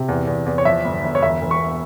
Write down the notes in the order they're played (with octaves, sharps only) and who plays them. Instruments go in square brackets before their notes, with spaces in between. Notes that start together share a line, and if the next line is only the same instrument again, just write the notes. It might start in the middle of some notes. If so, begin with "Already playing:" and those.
Already playing: [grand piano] C3
E2
E2
E2
C#5
F3 E5
G1
G1
C#5
E1 E5
E1
C#6